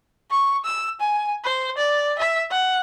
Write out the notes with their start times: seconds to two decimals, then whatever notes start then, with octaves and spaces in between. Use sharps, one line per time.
0.31 C#6
0.65 E6
1.00 G#5
1.44 C5
1.78 D5
2.19 E5
2.51 F#5